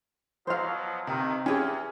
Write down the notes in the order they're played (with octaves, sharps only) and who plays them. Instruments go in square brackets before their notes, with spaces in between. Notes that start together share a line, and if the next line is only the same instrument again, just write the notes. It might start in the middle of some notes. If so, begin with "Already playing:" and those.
[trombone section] B2 F3 F#3 [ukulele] C5 F5
[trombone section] B1 D#3 [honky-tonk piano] C3
[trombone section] E2 [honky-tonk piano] C#4 [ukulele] G4 G#4